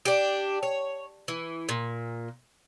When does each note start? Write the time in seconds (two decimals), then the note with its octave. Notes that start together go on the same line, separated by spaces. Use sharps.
0.05 D4 G4
0.63 C#5
1.28 E3
1.69 A#2